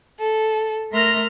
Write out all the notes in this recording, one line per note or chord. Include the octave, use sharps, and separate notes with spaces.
A4
A3 A#4 E5 C6 F6 A#6